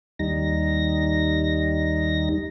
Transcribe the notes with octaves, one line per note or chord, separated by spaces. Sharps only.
D#2 G3 D#4 A#6